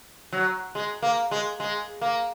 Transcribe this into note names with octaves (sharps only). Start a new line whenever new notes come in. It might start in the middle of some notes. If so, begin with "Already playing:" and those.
F#3
G#3
A#3
G#3
G#3
A#3